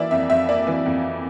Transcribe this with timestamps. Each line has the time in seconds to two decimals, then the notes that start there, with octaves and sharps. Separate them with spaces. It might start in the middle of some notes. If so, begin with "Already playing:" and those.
Already playing: E3 A#3 D5 E5
0.11 F2 E5
0.30 F2 E5
0.49 A#3 D5
0.67 E3
0.86 F2